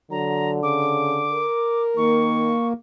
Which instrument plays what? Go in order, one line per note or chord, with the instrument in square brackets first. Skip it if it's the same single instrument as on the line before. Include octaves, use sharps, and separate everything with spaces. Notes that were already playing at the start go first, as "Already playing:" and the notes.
[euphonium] D3 [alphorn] F#3 [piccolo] A#5
[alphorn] C#3 [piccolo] D6
[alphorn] A#4
[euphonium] D#3 [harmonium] A#3 [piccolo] C#6